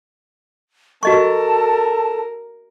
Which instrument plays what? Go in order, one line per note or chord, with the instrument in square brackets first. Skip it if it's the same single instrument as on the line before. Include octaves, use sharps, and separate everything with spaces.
[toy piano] F#4 D#5 C#6 [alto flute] A4 [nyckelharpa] A#4 [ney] A5